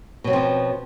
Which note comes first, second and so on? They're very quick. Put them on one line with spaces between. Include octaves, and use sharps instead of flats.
B2 F#3 C4 F3 C#4